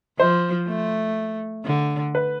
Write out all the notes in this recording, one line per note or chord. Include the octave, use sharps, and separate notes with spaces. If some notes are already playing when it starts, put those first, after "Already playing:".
F3 C5
A3
D3
B4